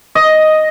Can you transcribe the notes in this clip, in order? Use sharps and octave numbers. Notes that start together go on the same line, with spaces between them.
D#5